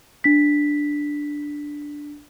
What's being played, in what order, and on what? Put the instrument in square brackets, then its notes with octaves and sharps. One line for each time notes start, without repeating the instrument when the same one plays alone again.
[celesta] D4 B6